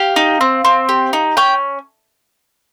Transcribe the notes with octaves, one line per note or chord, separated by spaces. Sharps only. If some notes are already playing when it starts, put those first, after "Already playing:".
Already playing: G4 F5
D#4
C4
C4
G4
D#4
C#4 G5